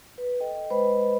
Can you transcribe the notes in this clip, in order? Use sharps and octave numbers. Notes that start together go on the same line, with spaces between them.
B4
A4 D#5 G5
G#3 B4 C5 D#5 B5